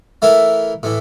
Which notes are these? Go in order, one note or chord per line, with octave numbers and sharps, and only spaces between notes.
E3 A3 E4 A#4
A2 E3